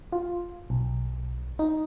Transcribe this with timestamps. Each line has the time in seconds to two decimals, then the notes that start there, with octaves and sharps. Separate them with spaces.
0.12 F4
0.70 B1
1.59 D#4